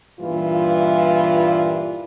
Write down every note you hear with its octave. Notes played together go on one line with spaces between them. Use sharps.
G2 A#2 E3 G3 F4